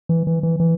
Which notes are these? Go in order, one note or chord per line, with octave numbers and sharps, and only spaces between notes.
E3
E3
E3
E3